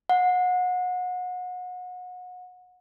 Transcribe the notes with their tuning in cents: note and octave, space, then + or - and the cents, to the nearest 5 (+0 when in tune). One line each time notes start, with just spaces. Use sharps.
F#5 -30